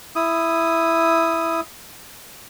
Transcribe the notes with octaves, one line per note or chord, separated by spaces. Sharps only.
E4 D#6